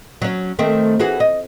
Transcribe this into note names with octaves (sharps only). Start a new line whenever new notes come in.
F#3 C#4
D#3 A3 C4
E3 F#4 G#4
D#5